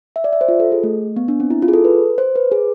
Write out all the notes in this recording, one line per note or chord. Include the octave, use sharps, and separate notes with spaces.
E5
D5
E5
C5
F4
A4
G#4
A3
B3
D4
C4
E4
F4
G#4
A4
B4
C5
B4
G#4